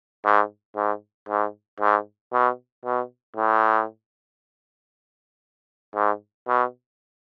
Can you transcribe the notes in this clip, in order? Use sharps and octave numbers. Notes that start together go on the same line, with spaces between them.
G#2
G#2
G#2
G#2
B2
B2
A2
G#2
B2